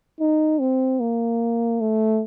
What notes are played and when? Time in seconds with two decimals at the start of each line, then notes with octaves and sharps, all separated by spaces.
0.20 D#4
0.60 C4
1.00 A#3
1.80 A3